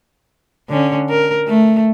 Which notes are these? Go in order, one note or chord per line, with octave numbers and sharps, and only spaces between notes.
D3 C#4
A#4
A3